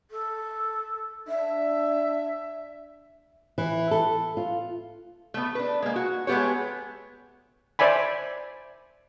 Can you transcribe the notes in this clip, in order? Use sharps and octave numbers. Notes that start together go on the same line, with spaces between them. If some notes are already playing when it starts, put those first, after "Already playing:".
A4
D4 E5
E3
A4
F4
A3 B3
D4 B4
G#3 A#3
F#4
G#3 A3 B3 G4 C#5
C5 D5 E5 G#5 B5